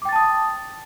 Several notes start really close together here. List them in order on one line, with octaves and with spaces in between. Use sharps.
D6 G5 A6 A5 D#6